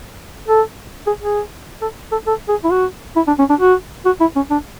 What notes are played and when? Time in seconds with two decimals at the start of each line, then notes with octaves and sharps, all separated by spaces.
0.48 A4
1.07 G#4
1.23 G#4
1.82 A4
2.12 A4
2.27 A4
2.49 G#4
2.64 E4
2.72 F#4
3.16 E4
3.27 D4
3.39 C#4
3.50 D4
3.60 F#4
4.05 F#4
4.21 E4
4.36 C#4
4.50 D4